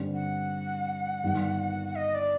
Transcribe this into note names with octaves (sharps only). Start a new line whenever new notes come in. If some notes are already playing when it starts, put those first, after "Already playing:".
Already playing: G2 D3 G3 C4
F#5
G1 G2 D#3
D#5
D5